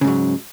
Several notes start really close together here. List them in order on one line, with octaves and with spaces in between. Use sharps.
C#3 G#2 F#3